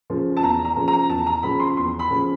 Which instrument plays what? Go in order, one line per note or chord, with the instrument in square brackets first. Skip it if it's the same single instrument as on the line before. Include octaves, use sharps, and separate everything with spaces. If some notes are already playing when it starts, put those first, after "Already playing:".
[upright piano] C#3 F3
A5
E2 A#5
A#5
C#3 F3
A#5
E2 A5
A#5
C#3 F3 B5
C6
E2 C6
B5
C#3 F3